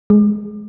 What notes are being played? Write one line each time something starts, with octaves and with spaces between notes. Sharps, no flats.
G#3